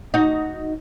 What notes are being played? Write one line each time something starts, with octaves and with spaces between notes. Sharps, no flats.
D#4 F#4